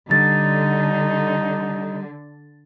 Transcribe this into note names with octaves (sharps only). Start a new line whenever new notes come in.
D3 G3 D#4 A6